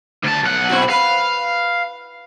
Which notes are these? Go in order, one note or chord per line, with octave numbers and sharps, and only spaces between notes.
D2 A5
B1 F#5
C4 E4 F#4
B4 F5